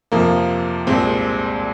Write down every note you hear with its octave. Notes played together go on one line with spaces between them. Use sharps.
F2 C3 F3 A#3
C2 A#2 G#3 C4